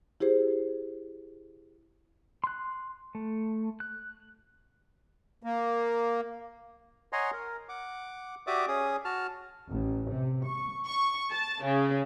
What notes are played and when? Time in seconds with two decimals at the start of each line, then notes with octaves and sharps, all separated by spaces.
0.20 E4 G4 G#4 C5
2.44 C6 F#6
3.15 A3
3.80 F#6
5.43 A#3
7.13 C#5 D#5 F#5 G#5 A#5 C6
7.33 A#4
7.69 F#5 D6
8.47 F#4 G4 D5 E5 D6 D#6
8.68 C#4 G#4 D#6
9.05 F#4 A5 F6
9.70 A1
10.10 C3
10.45 C#6
10.85 C#6
11.31 A5
11.63 C#3